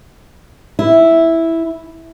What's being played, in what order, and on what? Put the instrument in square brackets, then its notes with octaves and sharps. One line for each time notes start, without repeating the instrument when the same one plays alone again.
[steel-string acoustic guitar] E4